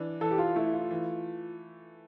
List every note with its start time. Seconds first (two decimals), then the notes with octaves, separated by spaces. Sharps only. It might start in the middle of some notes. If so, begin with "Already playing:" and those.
Already playing: E3 D4
0.21 E3 A4
0.31 G4
0.38 F4
0.56 A3 E4
0.73 F4
0.91 E3